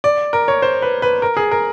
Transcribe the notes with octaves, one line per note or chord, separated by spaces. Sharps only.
D5
A#4
C#5
C5
B4
B4
A#4
G#4
A#4